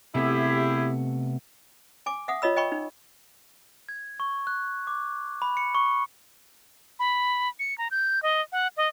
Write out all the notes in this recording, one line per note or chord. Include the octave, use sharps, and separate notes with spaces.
C3 A3 B3 E4 G4 G#4
G#5 D6
E5 F#5 D#6
F4 C#5 D#5 B5 E6
D#5 G5 B5 C#6
D#4
G#6
C#6
F#6
D6
B5
C#7
C#6
B5
C#7
A#5
G6
D#5
F#5
D#5